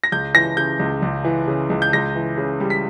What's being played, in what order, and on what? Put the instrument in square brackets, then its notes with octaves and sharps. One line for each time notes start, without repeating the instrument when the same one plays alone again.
[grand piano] A#6
C#2 G6
E3 A#6
C#3 G6
C#2
C#2
E3
C#3
C#2
G6
C#2 A#6
E3
C#3
G3
B6